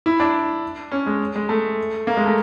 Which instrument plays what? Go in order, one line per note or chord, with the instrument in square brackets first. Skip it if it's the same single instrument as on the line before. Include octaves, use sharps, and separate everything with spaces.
[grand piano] E4
D4
C#4
G#3
G#3
A3
A#3
G#3
A3